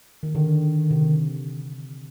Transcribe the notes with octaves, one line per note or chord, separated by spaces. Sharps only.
D#3
D3 D#3
C3